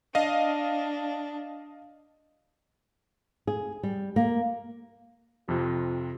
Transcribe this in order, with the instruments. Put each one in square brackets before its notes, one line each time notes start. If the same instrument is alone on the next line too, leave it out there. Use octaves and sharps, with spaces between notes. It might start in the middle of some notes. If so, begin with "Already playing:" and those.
[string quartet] D4 [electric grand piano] D#5 F5
[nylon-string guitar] G#4
G3
A#3
[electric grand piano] F2 C3 [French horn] F4